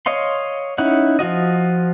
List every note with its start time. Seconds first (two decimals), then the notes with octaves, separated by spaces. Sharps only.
0.06 C#5 D#5 F5 C6
0.78 C#4 D#4 E4 F#5
1.19 F3 F4 F#4 D#5